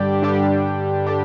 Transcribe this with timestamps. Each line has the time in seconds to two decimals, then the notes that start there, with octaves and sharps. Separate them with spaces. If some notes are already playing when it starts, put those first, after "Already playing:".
Already playing: G2 D3 G3 D4 G4
0.22 G2 D3 G3 D4 G4
1.06 D3 G3 D4 G4